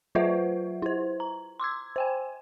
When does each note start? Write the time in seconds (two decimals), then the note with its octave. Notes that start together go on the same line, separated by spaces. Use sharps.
0.15 F#3 F4 B4 C5 E5 F#5
0.82 E4 C5
1.20 A#5
1.60 C6 D6 E6 G#6
1.96 C5 G5 G#5